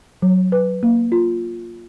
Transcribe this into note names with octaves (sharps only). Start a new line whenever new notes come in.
F#3
B4
A#3
F4